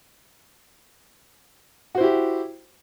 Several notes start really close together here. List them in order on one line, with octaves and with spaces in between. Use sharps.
F#4 C5 E4 G4